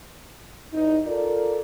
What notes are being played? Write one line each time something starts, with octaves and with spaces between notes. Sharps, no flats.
E2 D#4
F4 A4 A#4 D5